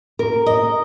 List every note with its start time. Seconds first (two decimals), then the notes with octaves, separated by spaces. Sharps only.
0.19 A#4
0.46 D#5